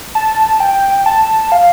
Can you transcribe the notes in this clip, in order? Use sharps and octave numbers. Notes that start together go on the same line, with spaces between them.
A5
G5
A5
F5